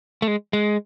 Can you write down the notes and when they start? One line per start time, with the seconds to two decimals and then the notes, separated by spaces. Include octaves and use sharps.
0.22 A3
0.28 G#3
0.53 G#3